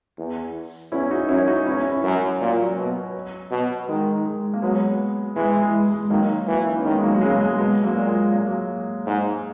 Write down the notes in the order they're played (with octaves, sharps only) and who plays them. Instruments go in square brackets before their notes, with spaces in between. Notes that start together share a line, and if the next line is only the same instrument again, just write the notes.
[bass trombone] E2
[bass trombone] E2 [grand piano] C#4 E4
[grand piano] D#4 F#4
[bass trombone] F#2 [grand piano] C#4 E4
[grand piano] D#4 F#4
[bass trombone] E2 [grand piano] C#4 E4
[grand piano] C#4 E4
[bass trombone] F#2
[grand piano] F#3
[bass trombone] A#2 [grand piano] F#3
[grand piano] F#3
[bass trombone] B2
B2
[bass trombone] D#3 [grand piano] G#3
[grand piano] G#3
A#3
[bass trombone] F#3 [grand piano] G#3 B3
[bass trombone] E3 [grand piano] G#3
[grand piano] G#3
G#3
G#3
[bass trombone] D#3 [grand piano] F#3 A#3
[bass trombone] E3 [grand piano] F#4
[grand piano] E4
D#4
C#4
[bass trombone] D#3 [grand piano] G#3 B3
[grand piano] G#3
F#3 A#3
F#3
[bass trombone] C#3 [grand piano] G#3
[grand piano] G#3
[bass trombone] B2 [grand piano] G#3
[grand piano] F#3 A#3
[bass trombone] A#2
[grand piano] G#3
A#3
G#3
F#3 A#3
[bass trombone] G#2